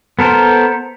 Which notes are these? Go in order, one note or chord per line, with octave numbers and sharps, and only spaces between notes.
B3 A4 A#4 C5